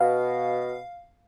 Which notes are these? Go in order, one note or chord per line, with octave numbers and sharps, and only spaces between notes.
B2 F5